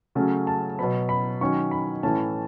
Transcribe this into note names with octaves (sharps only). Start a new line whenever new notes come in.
C#3 F#3 A3 C#4 A5
A5
B2 F#3 B3 B5
B5
D#3 F#3 C#4 C#6
B5
A2 E3 A3 C#4 A5